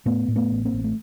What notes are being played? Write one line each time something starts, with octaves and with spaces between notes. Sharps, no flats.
A2 A3 B3
A2
A3 B3
A1
A#3 C4
A1
A3